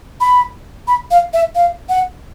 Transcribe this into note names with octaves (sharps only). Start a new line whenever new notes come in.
B5
B5
F5
E5
F5
F#5